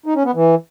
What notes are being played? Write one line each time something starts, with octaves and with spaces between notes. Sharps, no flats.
D#4
C#4
B3
E3